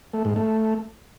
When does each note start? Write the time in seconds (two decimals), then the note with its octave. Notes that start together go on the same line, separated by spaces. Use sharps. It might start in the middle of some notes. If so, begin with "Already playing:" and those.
0.14 A3
0.25 G#2
0.36 A3